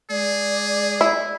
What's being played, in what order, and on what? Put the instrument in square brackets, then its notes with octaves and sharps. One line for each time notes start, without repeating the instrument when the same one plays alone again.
[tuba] G#3 [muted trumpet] G#4 [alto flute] D5
[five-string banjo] E4